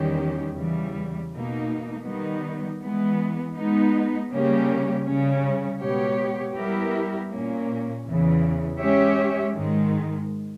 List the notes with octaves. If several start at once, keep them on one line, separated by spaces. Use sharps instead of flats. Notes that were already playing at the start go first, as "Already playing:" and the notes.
Already playing: E2 D#3 G3 C#4 G4
E2 C#3 E3 G3
B2 A#3 D#4
D#3 G3 B3 D#4
E3 G#3 B3
G#3 B3 D#4
C#3 G3 A#3 C#4 G4
C#3 G3 C#4
B2 G#3 B3 G4 C#5
G3 B3 E4 G4 A#4
A#2 A#3 C#4
E2 C#3 E3
G#3 C#4 G4 C#5 E5
G#2 D#3 G#3